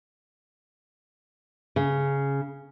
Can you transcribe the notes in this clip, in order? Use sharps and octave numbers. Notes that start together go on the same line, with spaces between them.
C#3